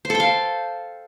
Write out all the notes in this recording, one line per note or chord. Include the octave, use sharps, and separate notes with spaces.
C5
A4
G5
F5